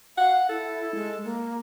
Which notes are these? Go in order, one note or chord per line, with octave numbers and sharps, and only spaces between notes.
F5 F#5
E4 A4
G#3
A#3